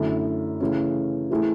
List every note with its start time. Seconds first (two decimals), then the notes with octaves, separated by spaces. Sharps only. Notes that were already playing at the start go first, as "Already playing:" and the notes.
Already playing: F#2 D3 A3 E4 A4
0.60 C#3 E3 A3 C#4
1.31 E3 A3 E4 G#4